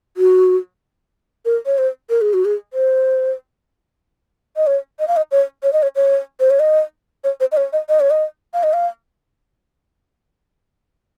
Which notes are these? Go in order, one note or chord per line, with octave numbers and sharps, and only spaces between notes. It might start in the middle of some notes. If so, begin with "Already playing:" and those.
F#4
A#4
C#5
C5
A#4
G#4
F#4
G#4
C5
D#5
C#5
D#5
F5
D#5
C#5
C#5
D#5
C#5
C#5
C5
C#5
D#5
C#5
C5
D#5
C#5
D#5
D#5
C#5
D#5
F5
D#5
F5